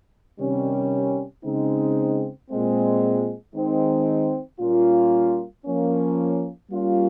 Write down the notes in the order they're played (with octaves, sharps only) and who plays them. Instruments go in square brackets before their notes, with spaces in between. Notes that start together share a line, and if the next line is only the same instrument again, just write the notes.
[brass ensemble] C3 D#3 G3 C#4
C#3 G#3 C4 D#4
A#2 G#3 C4
D#3 G#3 C4 D#4
A#2 G3 A#3 C#4 F4
F3 A#3 C#4
G3 A#3 C#4 F4